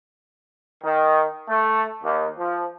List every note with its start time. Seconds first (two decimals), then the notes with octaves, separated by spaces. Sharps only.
0.84 D#3
1.49 A3
2.04 D#2
2.38 F3